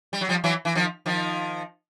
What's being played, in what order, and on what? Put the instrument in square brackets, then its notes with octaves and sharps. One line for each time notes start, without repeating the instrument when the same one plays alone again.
[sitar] G3
F#3
F3 G3
E3 F#3
E3
D#3 F3
D#3 F3